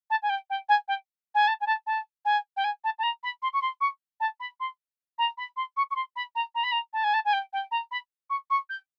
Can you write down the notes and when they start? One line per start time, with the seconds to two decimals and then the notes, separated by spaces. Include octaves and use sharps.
0.10 A5
0.22 G#5
0.29 G5
0.50 G5
0.68 G#5
0.88 G5
1.34 G#5
1.47 A5
1.60 G#5
1.66 A5
1.86 A5
2.25 G#5
2.56 G5
2.64 G#5
2.84 A5
2.98 A5
3.03 A#5
3.23 B5
3.42 C6
3.53 C#6
3.61 C6
3.80 C#6
4.20 A5
4.40 B5
4.60 C6
5.18 A#5
5.37 B5
5.56 C6
5.76 C#6
5.90 C#6
5.95 C6
6.16 B5
6.35 A#5
6.55 A#5
6.63 B5
6.71 A#5
6.93 A5
7.03 G#5
7.13 A5
7.25 G#5
7.33 G5
7.53 G5
7.71 A#5
7.91 B5
8.30 C#6
8.50 C#6
8.69 G6